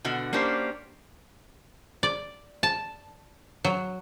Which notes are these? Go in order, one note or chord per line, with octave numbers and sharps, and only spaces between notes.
B2 D3 F#4
A#3 C#4 D4 G4 C5
D5
A5
F#3